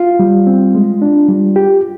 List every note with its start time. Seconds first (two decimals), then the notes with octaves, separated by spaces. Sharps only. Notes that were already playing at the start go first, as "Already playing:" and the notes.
Already playing: F4
0.19 G3
0.47 C4
0.75 G#3
1.02 D4
1.28 G3
1.56 G4